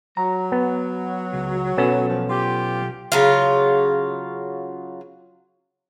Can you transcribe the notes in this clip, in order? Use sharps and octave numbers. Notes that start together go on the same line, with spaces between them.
F#3 A#5
B3
C#2
B1 B3 C#4 A4 F#5
F3
F4 G4
C#3 F#3 F4